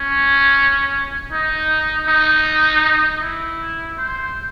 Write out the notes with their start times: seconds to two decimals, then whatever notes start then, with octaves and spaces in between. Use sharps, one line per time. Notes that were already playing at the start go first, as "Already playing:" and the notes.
Already playing: C#4
1.32 D#4
2.08 D#4
3.22 E4
3.98 C5